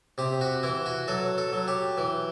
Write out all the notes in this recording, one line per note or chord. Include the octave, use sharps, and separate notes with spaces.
C3 G4
F#4
E3 E4
F#4
F#3 A4
A4
F#3
G4
E3